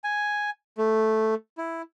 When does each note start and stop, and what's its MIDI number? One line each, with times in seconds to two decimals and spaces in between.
0.04 0.50 80
0.78 1.35 57
1.58 1.82 64